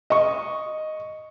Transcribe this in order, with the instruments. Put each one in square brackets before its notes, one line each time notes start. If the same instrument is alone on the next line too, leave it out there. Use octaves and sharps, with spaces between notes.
[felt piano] D#5 C#6